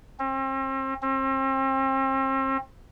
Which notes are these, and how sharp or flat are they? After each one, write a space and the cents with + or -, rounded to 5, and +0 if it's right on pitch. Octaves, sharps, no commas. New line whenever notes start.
C4 +40
C4 +40